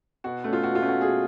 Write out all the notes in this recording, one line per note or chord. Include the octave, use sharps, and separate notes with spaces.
B2 F#4
A3 C#4
F4
B2 F#4
F4
A3 C#4
F#4
B2 G#4